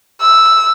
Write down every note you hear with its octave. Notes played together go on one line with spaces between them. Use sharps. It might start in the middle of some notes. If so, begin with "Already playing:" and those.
E6